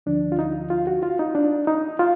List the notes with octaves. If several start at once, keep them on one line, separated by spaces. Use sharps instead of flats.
D2 D3 F3 D4
F4
D#4
F4
F#4
F4
D#4
D4
D#4
F4